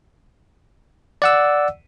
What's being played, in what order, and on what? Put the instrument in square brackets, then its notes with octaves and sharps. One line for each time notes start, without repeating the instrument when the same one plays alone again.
[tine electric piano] D5 F#5 E6